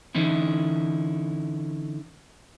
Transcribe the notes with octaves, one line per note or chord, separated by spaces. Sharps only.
D3 E3 C#4 D#4 E4